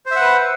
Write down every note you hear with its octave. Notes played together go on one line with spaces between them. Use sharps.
B4 C5 E5 F#5